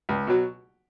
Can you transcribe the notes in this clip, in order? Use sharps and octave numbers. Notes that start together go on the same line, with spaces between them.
C#2
B2 F#3